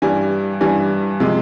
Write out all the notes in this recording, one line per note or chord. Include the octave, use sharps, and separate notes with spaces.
G2 E3 G3 G#5
G2 E3 G3 G#5
C3 F3 G#3